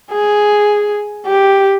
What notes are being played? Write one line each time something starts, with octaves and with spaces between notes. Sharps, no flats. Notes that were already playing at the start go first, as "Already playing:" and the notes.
G#4
G4